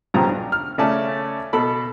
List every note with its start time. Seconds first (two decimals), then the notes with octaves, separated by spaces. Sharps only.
0.14 B1 G2 C#3 F3 A#5
0.29 D4
0.52 F6
0.78 C#3 A3 C#4 D5 A5
1.53 B2 A4 B5